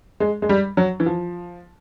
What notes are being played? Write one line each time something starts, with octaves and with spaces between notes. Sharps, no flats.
G#3
G#3
G3
F#3
E3
F3